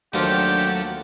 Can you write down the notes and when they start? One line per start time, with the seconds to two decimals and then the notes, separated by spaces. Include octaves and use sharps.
0.14 D#2 F3 F#3 A3 D4 G4